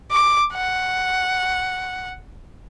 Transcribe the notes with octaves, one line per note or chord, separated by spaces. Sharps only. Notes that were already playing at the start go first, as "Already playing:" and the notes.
D6
F#5